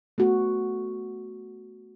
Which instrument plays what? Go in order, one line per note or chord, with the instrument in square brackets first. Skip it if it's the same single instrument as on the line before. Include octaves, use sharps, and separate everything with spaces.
[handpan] A3 B3 F#4